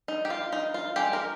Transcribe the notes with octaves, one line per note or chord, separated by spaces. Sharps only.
D#4
G4
F4
D#4
F4
G#3 D#4 G4
A#4